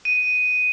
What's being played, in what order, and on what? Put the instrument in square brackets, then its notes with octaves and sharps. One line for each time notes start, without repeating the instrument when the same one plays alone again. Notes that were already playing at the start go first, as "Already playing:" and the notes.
[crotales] D#7